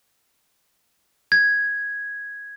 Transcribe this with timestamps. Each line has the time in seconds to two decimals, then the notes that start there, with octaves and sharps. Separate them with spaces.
1.32 G#6